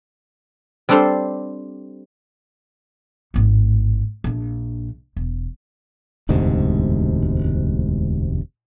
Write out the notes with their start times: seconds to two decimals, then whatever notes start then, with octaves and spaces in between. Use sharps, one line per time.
0.89 G3 C4 D4 A4 C5
3.34 G#1 A2
4.24 A#1 D4
5.16 E1
6.29 E1 D2 G#2 C3